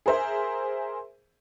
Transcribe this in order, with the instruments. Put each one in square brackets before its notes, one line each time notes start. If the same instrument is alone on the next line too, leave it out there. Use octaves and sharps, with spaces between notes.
[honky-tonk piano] G#4 A#4 C5 E5